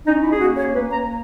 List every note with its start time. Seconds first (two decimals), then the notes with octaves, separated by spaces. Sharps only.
0.06 C#4 D#4
0.23 E4
0.32 G#4
0.40 A#3 F#4
0.57 C#5
0.74 A#3 B4
0.92 A#5